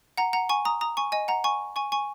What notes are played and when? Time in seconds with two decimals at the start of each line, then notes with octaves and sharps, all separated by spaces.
0.18 F#5 A#5
0.33 F#5 A#5
0.49 G#5 C#6
0.65 A#5 D#6
0.81 A#5 D#6
0.97 G#5 C#6
1.12 D#5 G#5
1.28 F#5 A#5
1.44 G#5 C#6
1.76 G#5 C#6
1.92 G#5 C#6